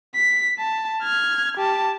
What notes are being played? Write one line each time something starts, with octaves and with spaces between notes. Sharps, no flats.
B6
A5
F6 G#6
G4 A5